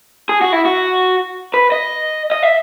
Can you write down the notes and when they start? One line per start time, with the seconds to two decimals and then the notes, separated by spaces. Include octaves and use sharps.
0.29 G#4
0.41 F#4
0.53 E4
0.65 F#4
1.54 B4
1.72 D#5
2.32 D#5
2.43 E5